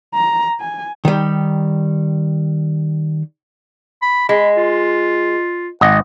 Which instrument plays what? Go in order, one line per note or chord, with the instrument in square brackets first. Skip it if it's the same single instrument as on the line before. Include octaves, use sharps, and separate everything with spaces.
[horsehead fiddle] A#5
G#5
[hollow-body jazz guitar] D#3 G3
[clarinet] B5
[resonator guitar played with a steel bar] G#3 [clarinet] B5
[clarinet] F4
[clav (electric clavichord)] G#1 D#5 [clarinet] F#5